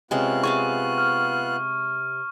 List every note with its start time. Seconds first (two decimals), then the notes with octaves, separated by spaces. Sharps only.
0.11 C3 G#3 B3 C#4 F4 F#6
0.43 G#4 E5 F5 C#6
0.98 F6